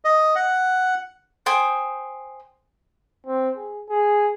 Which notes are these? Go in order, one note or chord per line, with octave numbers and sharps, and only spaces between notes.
D#5
F#5
C5 G5 G#5 D#6
C4
G#4
G#4